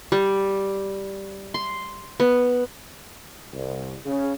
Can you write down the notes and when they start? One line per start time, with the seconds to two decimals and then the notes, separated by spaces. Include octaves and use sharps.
0.12 G3
1.54 C6
2.20 B3
3.52 C2
4.06 C#3